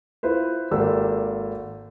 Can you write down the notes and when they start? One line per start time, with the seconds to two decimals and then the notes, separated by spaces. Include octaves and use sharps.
0.23 E4 F4 B4 C5
0.71 G#1 A#3 G4 A4 D5 E6